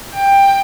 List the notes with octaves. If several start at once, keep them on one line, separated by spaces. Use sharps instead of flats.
G5